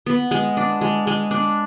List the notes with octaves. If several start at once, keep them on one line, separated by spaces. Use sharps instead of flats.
B3
G#3
D4
G#3
G#3
D4